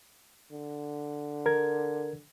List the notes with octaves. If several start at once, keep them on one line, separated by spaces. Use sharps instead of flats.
D3
A#4 G#6